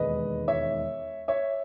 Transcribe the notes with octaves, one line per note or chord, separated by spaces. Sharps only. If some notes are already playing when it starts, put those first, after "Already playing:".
Already playing: E1 D#2 D#3 G#3 B4 D#5
C#5 E5
C#5 E5